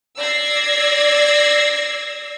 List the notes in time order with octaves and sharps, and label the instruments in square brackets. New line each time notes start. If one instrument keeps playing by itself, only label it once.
[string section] D5 E6 G#6 A#6 C7